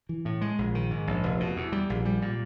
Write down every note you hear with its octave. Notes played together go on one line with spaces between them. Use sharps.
E3
A2
G#3
A#1
D#3
G#2
A#1
F1
B2
E2
G3
A#1
G3
A#2